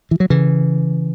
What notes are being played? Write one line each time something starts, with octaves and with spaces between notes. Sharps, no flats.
E3
F#3
C#3 E3